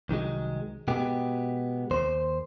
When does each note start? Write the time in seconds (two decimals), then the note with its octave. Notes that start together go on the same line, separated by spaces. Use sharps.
0.09 C2 D#3 F#3 G#3
0.88 B2 G#3 B3 G4
1.91 D#2 C5